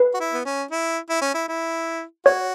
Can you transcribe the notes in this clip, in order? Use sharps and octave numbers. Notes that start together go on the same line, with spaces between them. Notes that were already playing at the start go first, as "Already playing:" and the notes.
Already playing: B4
F#4
E4
B3
C#4
E4
E4
C#4
E4
E4
F#4 C#5